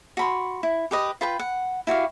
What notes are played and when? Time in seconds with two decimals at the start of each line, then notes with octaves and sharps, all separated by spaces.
0.17 F#4 B5 C6
0.63 E4
0.91 G4 B4 D#5
1.21 F4 B4 G5 B5
1.39 F#5
1.87 E4 F#4 G4 F5